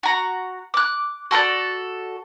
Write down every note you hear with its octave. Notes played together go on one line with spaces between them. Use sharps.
F#4 A#5
D6 F#6
F#4 A4 C5 D5